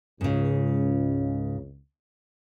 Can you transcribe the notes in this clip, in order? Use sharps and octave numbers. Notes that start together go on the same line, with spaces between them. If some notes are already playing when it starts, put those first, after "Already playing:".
C#2 G#2 C#3